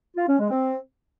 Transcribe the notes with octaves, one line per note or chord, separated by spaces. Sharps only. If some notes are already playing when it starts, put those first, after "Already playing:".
F4
C#4
G#3
C4